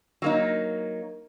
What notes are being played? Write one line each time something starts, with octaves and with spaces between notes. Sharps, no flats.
F#3 A#3 D#4